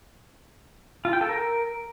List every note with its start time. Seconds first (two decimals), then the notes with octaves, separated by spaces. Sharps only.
1.05 F4
1.13 G5
1.21 A4
1.29 A#4